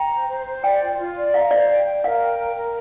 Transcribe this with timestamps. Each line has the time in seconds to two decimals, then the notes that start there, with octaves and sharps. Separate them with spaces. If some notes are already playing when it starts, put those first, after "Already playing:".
Already playing: G5 A#5
0.10 C5
0.28 C5
0.45 C5
0.63 D5 G5
0.80 F4
0.99 F4
1.16 D5
1.33 F5 A#5
1.51 C5 D5
1.69 G5
1.86 G5
2.04 A#4 F5
2.22 G5
2.39 A#4
2.56 A#4